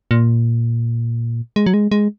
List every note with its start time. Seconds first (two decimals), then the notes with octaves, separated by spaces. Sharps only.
0.11 A#2
1.56 G#3
1.66 F#3
1.74 G#3
1.91 G#3